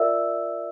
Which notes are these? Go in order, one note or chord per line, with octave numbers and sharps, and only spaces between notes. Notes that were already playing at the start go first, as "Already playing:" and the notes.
Already playing: F4 A#4 D5 E5 E6